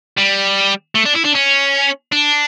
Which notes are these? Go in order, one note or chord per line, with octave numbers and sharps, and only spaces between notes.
G3
A3
D4
E4
D4
C#4
D4